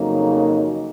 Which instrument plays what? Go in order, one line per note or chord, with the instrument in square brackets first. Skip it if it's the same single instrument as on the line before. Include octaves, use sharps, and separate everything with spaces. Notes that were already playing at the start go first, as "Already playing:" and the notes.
Already playing: [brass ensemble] F2 C#3 F#3 A#3 D#4